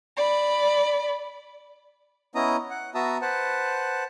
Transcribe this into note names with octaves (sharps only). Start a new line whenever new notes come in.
D5 B5
B3 C#4 E4 D#5 A#5 D#6
F#5
B3 F#4 E5 A5 A#5 D#6
B4 C5 F#5 A5